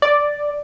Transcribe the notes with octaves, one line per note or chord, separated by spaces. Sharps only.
D5